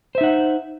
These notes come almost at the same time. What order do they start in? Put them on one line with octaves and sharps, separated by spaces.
C5 E5 D#4 F#5